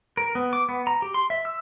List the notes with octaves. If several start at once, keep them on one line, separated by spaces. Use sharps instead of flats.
A#4
B3
D6
B3
A#5
G4
C6
E5
E6